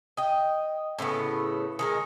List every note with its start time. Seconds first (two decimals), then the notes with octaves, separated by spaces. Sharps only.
0.17 D#5 G5
0.99 A2 C#3 A3 B3
1.79 D#3 G#3 A#4